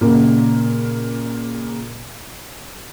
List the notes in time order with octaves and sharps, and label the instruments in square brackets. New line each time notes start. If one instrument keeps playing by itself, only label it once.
[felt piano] A#2 C#3 A#3